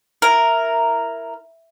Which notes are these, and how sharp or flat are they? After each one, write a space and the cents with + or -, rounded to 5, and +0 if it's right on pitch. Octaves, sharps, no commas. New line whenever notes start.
E4 +5 A#4 -5